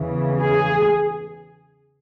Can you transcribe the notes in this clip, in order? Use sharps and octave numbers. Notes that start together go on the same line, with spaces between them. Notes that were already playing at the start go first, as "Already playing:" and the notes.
Already playing: E2 C#3 E3
G#4